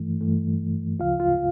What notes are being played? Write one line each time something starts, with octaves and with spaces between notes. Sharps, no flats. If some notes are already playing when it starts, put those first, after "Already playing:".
Already playing: G2 E3 A3
G2 E3 A3
D2 C#3 F3 F4 F5
F4 F5